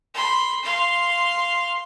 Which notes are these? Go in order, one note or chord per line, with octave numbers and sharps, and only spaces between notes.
B5 C6
F5 C6